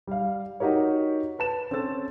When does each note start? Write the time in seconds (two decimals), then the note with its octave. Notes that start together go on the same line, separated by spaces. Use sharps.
0.07 G3 F5
0.60 D#4 F#4 G4 A#4 C#5
1.39 B4 A5 E7
1.71 C4 C#4 A4 E6 A6